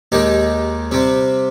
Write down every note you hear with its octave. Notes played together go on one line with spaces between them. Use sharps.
D#2 D#3 G#3 D#4 G4
C3 G3 C4